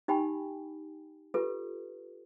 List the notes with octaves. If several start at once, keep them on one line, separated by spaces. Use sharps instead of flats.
D#4 G4 G5 G#5 B5
F4 G4 A4 B4